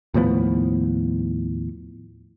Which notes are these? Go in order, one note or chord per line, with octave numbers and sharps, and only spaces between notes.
D#2 A2 F3 B3